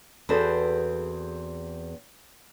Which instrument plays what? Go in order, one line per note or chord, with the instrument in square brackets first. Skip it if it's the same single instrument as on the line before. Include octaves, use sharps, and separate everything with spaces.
[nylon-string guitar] E2 C4 F#4 G#4 A4 B4